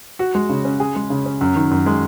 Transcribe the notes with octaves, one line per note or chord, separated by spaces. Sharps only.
F#4
G#3
C#3
C#4
G#4
G#3
C#3
C#4
F#2
D#3
F#2
G#3